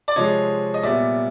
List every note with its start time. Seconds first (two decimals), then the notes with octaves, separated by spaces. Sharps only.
0.08 D5
0.16 C3 F3 G#3 C4 C#5 D#5
0.74 D#5
0.83 A#2 G3 B3 D5 E5